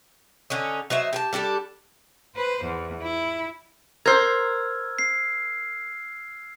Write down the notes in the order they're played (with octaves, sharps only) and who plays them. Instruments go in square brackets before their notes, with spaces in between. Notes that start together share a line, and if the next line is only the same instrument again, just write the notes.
[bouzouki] D3 C#4 D#4
F#3 D#4 C5 E5
G4 G#5 A5
G3 D4 G4 A4
[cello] B4 C5
E2
E4
[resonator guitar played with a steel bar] A#4 C5 [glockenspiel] E6 F6 G#6
[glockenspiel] C7